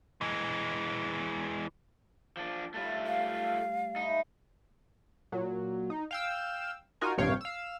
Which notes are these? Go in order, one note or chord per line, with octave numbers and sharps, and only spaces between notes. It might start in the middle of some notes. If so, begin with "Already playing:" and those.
E3 G#3
F3 D4
A2 G3 A3 F4
F5
A3 D#4 E4
A#2 F#3
D#4
F5 G5 E6
D#4 F4 F#4 A#4 G#5
A#1 G2 C3 C#5 F5 G5
F5 E6